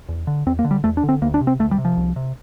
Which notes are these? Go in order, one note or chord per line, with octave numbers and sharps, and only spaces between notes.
E2
D3
E2 C4
A#3
D3
G3
E2 A3
D4
D3
C4
D2 A#3
D4
C3
C4
D2 A3
G3
C3
F3
C2
C3